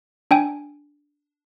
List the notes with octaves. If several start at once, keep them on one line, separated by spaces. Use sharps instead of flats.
D4 G5 G#5